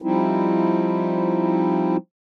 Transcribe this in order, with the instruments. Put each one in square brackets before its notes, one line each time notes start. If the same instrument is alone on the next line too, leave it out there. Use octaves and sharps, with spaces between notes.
[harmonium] F3 G3 C4 D#4 E4